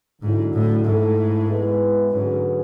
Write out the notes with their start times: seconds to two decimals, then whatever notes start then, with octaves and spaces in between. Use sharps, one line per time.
0.22 G#2 D3 F#3 C#4 E4 A4
0.53 A2
0.85 G#2 A3 E4 A4
1.48 G#3 B3 E4 G#4 B4
2.11 G#2 D3 F#3 C#4 G#4 B4